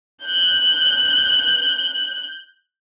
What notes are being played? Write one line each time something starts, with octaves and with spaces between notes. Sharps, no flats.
F#6 G6